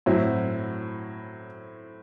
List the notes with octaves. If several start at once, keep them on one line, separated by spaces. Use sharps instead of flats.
A2 F#3 C4 E4